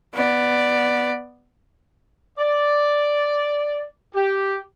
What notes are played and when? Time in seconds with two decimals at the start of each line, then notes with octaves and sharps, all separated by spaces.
0.14 B3 D5
2.37 D5
4.14 G4